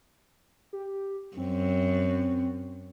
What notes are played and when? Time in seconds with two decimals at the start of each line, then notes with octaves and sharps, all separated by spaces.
0.73 G4
1.37 F#2 C4